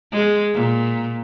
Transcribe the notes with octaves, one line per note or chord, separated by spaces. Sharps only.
G#3
A#2